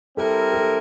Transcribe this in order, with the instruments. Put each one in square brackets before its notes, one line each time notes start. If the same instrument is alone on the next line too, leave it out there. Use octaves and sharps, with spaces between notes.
[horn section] G3 C4 E4 A#4 [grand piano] A4
[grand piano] A4